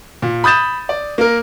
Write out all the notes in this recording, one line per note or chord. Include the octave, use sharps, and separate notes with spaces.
A#2
B5 D#6 G6 A6 E7
D5
A#3 A#4